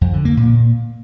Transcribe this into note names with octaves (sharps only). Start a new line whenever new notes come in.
F2
D3
A#3
A#2